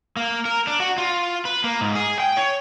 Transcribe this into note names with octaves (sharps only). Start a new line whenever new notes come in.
A#3
A#4
D4
F#4
F4
B4
A#3
G#2
G#4
G5
C#5